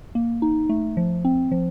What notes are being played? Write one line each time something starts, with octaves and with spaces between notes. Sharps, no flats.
A#3
D#4
A3
F3
C4
F3